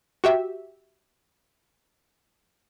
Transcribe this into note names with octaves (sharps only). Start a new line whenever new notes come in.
F#4 G4 E5